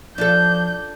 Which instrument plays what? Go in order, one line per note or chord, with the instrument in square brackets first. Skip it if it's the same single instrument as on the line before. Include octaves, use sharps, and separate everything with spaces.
[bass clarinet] F3 [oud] D4 F4 A4 [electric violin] G6